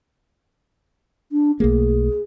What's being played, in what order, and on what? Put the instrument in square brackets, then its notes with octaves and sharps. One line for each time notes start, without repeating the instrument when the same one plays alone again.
[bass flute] D4
[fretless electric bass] B1 A3 A#3 [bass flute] G#4